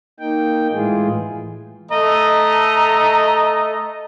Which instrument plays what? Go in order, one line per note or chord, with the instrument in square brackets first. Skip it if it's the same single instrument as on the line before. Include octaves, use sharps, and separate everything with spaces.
[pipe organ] A#3 D#4 G5
A2 E3 G#3 F4 G#4
[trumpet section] A3 D#5 A#5